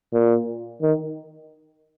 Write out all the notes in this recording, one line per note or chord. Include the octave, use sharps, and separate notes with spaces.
A#2
D#3